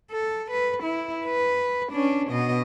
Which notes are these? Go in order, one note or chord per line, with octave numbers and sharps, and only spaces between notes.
A4
B4
E4
B4
C#4 D4
B2 D#5